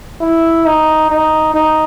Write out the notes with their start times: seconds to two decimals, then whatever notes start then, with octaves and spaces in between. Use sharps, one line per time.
0.21 E4
0.65 D#4
1.10 D#4
1.53 D#4